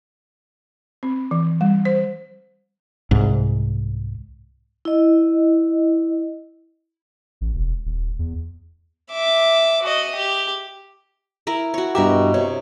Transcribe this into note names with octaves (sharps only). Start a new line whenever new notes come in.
C4
E3
G3
C5
C2 G#2
E4 D#5
A1
E1
D#1
E2
E5 D6
F#4 D#5
G4
E4 A#4
F#4 C#5
G2 B2 G4 A#4 E5
C3 C#5